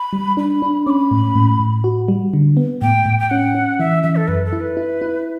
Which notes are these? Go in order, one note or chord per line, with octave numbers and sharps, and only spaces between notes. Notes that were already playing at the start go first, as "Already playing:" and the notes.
Already playing: B5
G3
D4 B5
D4
C#4 B5 D6
A2
A2
A2
F#4
G3
D3
B3
A2 G5
A2
G5
C#4 F#5
C#4
E3 E5
E3 E5
A4
F#2 B4
A4
E4
B4
E4
E4